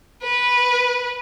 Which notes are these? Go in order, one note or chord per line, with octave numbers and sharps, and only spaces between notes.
B4